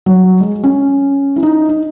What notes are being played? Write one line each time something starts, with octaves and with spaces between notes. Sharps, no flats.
F#3
G#3
C#4
E4
D#4
D#4